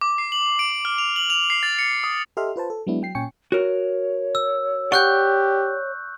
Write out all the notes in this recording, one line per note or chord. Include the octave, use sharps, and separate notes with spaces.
D6
C7
F#7
D7
F6
F7
F#7
F7
C7
A6
C#7
D#6
G4 A4 D#5 E5 C6 F6
F4 B4 C5 A5
A4
F#3 G#3 B3 D4 E4
F#3 G5 C7
A#2 C#4 G5 G#5 C#6 C#7
F#4 A#4 C#5
E6
G4 D5 F#5 C#6 F#6 G6